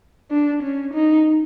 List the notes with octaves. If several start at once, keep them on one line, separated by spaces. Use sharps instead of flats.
D4
C#4
D#4